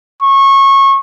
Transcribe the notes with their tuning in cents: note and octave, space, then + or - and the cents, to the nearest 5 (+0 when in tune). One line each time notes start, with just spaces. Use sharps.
C#6 -25